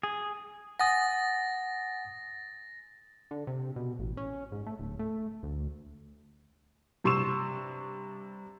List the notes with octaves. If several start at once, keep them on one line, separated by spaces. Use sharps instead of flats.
G#4
F#5 G#5 D#6 A6 A#6
D3
C3
B2
A1
C#4
G#2
A3
D1
A3
D2
G2 C3 C6 C#6 E6 E7